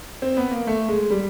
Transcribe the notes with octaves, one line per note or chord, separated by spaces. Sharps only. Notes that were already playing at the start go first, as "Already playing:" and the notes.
C4
B3
A#3
A3
G#3
G3